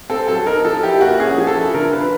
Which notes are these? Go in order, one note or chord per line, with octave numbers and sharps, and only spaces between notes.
C4 A4
F#3 A4
D#4 A#4
F3 A4
E4 G4
A#3 F#4
C#4 G#4
F3
A4
E4
D3 A#4
F4 B4